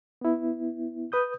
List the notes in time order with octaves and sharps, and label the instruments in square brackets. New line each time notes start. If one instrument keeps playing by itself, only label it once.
[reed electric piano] B3 E4
B4 D#6 G6